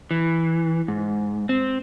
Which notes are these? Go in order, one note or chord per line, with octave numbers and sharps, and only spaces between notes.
E3
G#2
C4